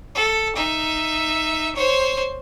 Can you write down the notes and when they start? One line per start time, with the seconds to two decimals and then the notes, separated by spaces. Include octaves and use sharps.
0.15 A4
0.55 D#4 E5
1.76 C5 C#5